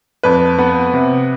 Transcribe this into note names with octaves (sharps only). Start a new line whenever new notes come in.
F2 B4
B3
C3